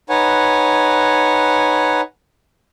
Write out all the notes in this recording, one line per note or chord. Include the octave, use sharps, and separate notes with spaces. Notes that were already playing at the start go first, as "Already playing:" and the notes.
D#4 B4 C#5 F#5 G#5